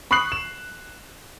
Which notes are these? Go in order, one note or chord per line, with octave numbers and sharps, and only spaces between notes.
B5 C#6 D#6 F#6 C7 F#7
E7